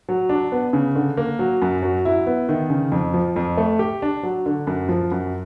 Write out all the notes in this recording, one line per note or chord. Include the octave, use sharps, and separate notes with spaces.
F#3
D4
B3
C#3
D3
A#3
F#3
F#2
F#3
E4
B3
D#3
C#3
F2
F3
F2
A3
G4
D4
F#3
D3
F#2
F3
F#2